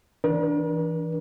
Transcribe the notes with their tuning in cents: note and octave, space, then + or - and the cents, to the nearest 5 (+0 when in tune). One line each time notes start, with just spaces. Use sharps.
E3 -10 D4 +0 A#4 +45